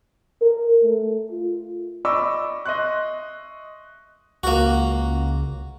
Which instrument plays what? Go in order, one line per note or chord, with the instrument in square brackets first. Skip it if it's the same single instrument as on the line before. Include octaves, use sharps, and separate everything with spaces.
[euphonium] A#4
A3
F4
[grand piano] D5 D#5 B5 C#6 D6 E6
D#5 E5 C6 C#6 F#6
[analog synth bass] C#2 [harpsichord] A#3 F#4